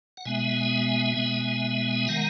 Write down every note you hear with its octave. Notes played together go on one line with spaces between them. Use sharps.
F#5
B2 G#3 B3 E5 G#5
B2 G#3 B3
D#3 G#3 F#5 A#5